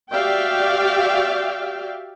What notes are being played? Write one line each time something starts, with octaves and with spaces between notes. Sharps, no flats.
F#4 G4 D5 E5 F5 G5